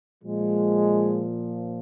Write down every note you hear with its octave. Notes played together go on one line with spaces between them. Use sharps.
A#2 F3 G#3